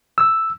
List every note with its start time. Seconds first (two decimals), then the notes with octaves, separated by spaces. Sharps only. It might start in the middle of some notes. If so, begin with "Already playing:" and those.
0.18 E6